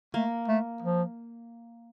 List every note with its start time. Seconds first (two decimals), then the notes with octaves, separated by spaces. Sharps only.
0.14 A3 A#3
0.48 A3
0.82 F3